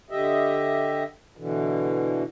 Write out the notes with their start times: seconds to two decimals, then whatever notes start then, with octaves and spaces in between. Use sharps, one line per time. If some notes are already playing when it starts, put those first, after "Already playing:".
0.10 D3 G4 D#5 E5
1.37 B2 D3 E3